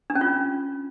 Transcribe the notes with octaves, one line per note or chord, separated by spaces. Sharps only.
D4
C#4
F4